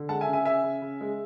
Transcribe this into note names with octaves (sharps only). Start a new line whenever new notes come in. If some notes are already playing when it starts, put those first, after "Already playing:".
Already playing: D3
G#3 F#5 A5
E5 G#5
C#3
E5 G#5
C#3 E5 G#5
C#3
C#3
G#3